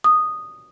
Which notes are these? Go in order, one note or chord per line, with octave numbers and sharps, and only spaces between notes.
D#6